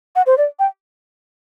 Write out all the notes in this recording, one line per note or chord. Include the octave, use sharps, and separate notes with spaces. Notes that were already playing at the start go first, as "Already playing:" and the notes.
F#5
C5
D5
G5